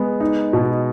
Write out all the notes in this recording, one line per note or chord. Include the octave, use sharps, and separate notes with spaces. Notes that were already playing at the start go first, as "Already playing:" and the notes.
Already playing: G#3 B3
D#4
B2